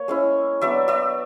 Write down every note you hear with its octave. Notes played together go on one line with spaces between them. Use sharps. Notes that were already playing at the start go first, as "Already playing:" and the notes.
Already playing: A#3 C#5
G#3 C#4 E4
F#3 B3 D4 D5 E5
D5 E5